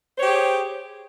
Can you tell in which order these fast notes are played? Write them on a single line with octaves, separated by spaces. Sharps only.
C5 C#5 G4 G#4